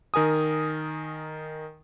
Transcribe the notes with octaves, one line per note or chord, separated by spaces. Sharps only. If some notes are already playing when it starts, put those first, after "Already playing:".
D#3 A#4 G#5 D#6